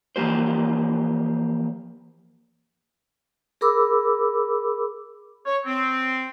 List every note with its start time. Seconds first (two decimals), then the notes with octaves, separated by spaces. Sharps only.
0.16 E3 F3 A#3 G4 C5
3.61 G#4 A#4 B5 D6 E6
5.46 C#5
5.65 C4